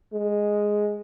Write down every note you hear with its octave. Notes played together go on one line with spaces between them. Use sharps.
G#3